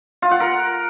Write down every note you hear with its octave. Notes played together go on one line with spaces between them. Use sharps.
F4
F#5
A#4